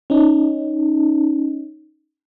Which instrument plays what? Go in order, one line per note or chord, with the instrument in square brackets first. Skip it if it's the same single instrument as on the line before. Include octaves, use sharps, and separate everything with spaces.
[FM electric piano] C#4 D#4